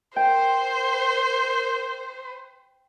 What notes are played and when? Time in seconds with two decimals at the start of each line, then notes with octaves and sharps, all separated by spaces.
0.16 A#4 C5 G5